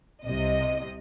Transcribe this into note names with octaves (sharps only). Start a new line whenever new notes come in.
C2 C3 D#5